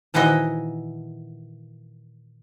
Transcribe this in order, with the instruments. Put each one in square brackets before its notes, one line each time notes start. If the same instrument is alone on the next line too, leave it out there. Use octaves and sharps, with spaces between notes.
[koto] A#2 D#3 E3 E4 F#4 D#5